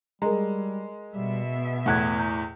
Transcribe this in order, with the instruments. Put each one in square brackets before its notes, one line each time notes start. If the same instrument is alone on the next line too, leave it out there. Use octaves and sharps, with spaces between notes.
[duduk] G3 [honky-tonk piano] G#3 [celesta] A#4 A#5
[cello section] B2 E5 [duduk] G3
[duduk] B3
[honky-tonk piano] E2 A2 [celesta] F#5 F#6 G#6
[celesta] A#5 G6